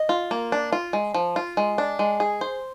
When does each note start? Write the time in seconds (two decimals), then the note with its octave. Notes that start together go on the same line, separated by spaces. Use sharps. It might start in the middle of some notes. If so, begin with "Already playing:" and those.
Already playing: D#5
0.09 F4
0.31 A#3
0.52 D4
0.73 F4
0.93 G#3
1.14 F3
1.36 F4
1.57 G#3
1.78 D4
1.99 G#3
2.20 G#4
2.41 C5